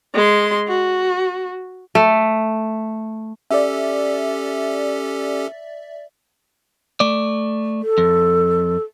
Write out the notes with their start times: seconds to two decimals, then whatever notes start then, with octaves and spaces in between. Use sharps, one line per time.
0.14 G#3 C6
0.68 F#4
1.95 A3
3.51 C#4 G4 A4 D5 E5
7.00 A3 D5
7.82 A4
7.98 F2